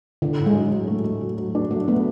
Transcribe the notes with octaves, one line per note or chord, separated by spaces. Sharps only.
D3 D4
A2
G#3
F#3
F#3
A3
A3
F#3
F#3
D4
F#3 A3
A3 B3